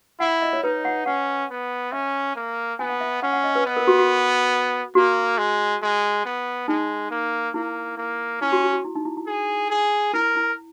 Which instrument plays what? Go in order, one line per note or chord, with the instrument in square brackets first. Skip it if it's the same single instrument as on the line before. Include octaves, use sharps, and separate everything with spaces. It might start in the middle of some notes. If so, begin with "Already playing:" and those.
[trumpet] E4 [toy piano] F#5
[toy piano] D#5
C#5
[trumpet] D#4 [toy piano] B4
[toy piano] F#5
[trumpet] C#4 [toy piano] F#5
[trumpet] B3
[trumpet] C#4 [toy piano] E5
[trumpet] A#3
[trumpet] B3 [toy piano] G#5
[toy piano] F#5
E5
[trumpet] C#4 [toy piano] F#5
[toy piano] F#5
D#5
B4
[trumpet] B3
[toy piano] A#4
F#4
F#4
[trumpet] A#3 [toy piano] F#4
[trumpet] G#3
G#3
B3
[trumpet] G#3 [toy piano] D#4
[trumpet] A#3
[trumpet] A#3 [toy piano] E4
[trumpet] A#3
[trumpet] C#4 [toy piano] E4
[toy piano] F#4
F#4
F#4
E4
D#4
E4
E4
[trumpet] G#4
G#4
[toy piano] E4 [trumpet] A#4
[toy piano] E4